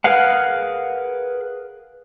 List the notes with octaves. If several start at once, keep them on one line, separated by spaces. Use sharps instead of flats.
G#4 A#4 B4 F5 F#5